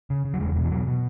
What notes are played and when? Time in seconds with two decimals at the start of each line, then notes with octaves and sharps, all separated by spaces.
0.10 C#3
0.25 C#3
0.34 F#3
0.40 E2 G#3
0.56 B2
0.65 E3
0.71 B2 F#3
0.87 B2